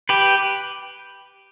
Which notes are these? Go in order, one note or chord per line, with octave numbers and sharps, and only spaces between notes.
G4 B4